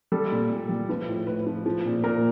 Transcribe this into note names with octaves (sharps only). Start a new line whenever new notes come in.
G3 A4
A#2
A#2
G3
F3 B4
A2
A2 B4
F3
F3
A#2
A#2 A#4